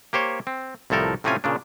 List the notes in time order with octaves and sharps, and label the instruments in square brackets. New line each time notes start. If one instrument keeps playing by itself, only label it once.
[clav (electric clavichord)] A#3 G4 C5 C#5
C4
C2 A2 F3 A4 A#4
A2 C3 C4 C#4 F4 G#5
A#2 C#3 D4